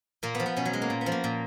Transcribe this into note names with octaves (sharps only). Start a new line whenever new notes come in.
A#2 A#3
F3 B3
B3
B2 C#4
F#3
G#3
A#3
A#2
B3
F3
A#3
A#2